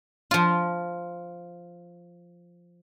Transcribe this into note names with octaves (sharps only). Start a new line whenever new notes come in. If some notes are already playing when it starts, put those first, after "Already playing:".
F3 F4